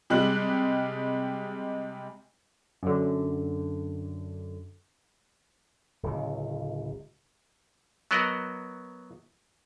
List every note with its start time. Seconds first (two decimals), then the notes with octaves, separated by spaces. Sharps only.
0.10 C3 G3 G#3 F#6 F#7
2.83 F#2 D3
6.03 D1 C#2
8.11 F#3 B3 F#4 A#4 D#5